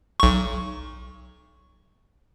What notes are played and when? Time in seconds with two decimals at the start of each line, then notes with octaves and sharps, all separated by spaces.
0.20 B1 C#6